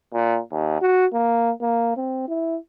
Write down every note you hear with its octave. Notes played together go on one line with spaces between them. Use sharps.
A#2
D#2
F#4
A#3
A#3
C4
E4